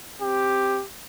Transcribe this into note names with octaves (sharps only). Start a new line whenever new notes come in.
C4 G4